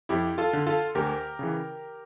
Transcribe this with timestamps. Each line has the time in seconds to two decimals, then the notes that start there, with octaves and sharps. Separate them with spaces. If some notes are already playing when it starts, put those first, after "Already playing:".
0.09 F2 E4 G4
0.38 F4 A4
0.53 D3
0.67 F4 A4
0.95 D2 G4 A#4
1.39 C#3 E3